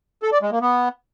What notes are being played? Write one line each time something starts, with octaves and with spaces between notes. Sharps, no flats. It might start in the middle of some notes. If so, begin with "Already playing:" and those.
A4
D5
G#3
A#3
B3